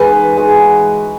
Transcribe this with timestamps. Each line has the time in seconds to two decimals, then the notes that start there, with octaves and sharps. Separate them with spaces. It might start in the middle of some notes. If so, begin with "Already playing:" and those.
Already playing: E3 G#3 D#4 F#4 B4
0.37 E3 G#3 D#4 F#4